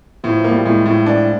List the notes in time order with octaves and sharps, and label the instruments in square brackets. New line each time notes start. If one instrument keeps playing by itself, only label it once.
[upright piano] A2 [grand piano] F3
[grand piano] F3
[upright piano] A#3
[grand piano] G3
[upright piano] A2 [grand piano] G#3
[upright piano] A2
D4